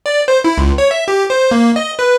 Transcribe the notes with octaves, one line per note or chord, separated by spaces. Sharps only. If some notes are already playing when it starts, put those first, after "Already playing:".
D5
C5
E4
C#2
C#5
E5
G4
C5
A#3
D#5
B4